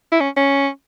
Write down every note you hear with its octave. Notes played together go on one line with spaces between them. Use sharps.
E4
C#4
C#4